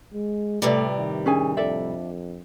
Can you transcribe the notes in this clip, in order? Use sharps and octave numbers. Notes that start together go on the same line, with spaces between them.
G#3
A2 C3 G3 A3 F4 B4 D5
D#3
C#4 D4 G#4 A#4 G#5
F2 A4 D5 E5